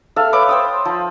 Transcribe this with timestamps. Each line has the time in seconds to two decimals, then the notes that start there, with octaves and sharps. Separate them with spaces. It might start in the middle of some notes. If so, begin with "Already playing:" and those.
0.16 A4 E5 F5
0.33 B4 C#5 D6
0.49 C5 G5 D#6
0.85 F3